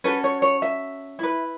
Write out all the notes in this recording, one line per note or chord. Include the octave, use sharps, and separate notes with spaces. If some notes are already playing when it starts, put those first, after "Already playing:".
C#4 F#4 A4 B4
C#5
C#5
E5
E4 B4